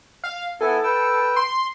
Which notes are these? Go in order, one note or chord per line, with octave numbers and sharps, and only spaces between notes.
F5
B3 E4 A4 G#5
B4 G5 E6
C6